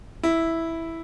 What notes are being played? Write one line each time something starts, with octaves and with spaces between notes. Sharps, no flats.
E4